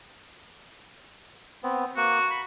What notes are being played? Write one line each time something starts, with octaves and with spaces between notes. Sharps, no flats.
B3 C4
A#3 F#4
B5